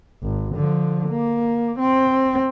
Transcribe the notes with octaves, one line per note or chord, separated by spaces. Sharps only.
G#1
D3 F3
A#3
C4